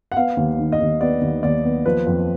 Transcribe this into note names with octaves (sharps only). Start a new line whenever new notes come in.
F#5
B3 F5
D#2
D#3
D#5
D#2
B3 D5
D#2
D#2 D5
B3
F3 B4
F2